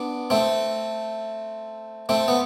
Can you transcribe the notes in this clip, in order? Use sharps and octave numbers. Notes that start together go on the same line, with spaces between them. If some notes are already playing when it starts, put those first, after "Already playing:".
Already playing: B3 D4
A3 C4
A3 C4
B3